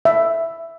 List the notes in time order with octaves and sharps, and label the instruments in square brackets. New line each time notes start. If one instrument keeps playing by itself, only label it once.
[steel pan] E5